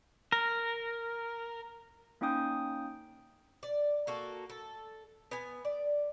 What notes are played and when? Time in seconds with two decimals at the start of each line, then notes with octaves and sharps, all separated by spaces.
0.32 A#4
2.21 A#3 C#4 D#4 G5 D#6 G6
3.63 D5
4.07 A#3 F#4 A4
4.50 A4
5.31 B3 G#5
5.65 D5